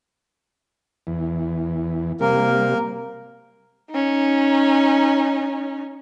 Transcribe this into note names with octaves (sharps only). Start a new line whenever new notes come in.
E2
C3 G3 A#3 A#4
C#4 D#4